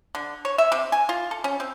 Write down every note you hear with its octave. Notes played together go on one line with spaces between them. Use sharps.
D3
C#5
E5
C3
G#5
F4
A4
C#4
C4